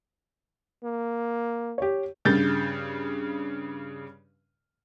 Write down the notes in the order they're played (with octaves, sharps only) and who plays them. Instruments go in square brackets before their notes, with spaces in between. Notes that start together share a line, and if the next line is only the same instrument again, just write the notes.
[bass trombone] A#3
[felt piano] G4 C#5
[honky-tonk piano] G2 C#3 G6 A6